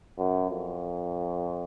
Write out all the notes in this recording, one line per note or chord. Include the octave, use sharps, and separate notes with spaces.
F#2
F2